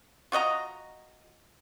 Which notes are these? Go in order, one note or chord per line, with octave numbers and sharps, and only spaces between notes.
F4 F#4 D#5 A#5